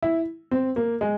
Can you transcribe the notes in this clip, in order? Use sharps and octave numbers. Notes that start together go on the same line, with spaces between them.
E4
C4
A#3
G#3